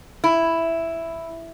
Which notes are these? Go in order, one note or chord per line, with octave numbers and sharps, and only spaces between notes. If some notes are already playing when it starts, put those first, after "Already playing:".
E4